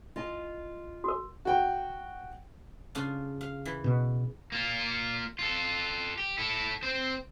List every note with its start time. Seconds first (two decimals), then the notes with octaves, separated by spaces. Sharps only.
0.16 F4 D#5 G#5
1.04 F#4 A#4
1.45 F#4 G5
2.95 C#3 D4 F4
3.41 F5
3.65 E3
3.84 B2
4.52 A#3 F4
5.39 F4 A4
6.18 G4
6.38 E4 A4
6.83 C4 C5